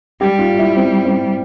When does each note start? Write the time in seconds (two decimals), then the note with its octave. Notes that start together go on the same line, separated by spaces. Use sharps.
0.21 G3 G4
0.39 F4
0.59 E4
0.77 C4
1.05 C4